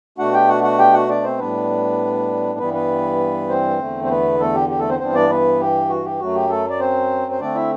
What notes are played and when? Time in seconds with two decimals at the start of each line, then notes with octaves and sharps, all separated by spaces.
0.18 B2 A3 D4 F#4 F#5
0.34 G4 G5
0.49 F#4 F#5
0.63 F#4 F#5
0.79 G4 G5
0.93 F#4 F#5
1.09 D4 D5
1.24 C4 C5
1.39 A2 G3 B3 D4 B4
2.59 G2 E3 G3 B3 B4
2.74 B3 B4
3.49 C4 C5
3.79 E2 D3 A3
4.04 C5
4.09 B3 B4
4.40 A3 A4
4.54 G4
4.70 G4
4.79 A3 A4
4.89 C4 C5
4.99 G2 E3 B3 C4 D4 C5
5.15 D4 D5
5.29 B3 B4
5.60 G4
5.90 F#4
6.05 G4
6.19 F#2 F#3 A3 F#4
6.35 G4
6.50 A3 A4
6.70 D5
6.80 C4 C5
7.32 C5
7.40 D3 A3 C4 D4 D5
7.55 E4 E5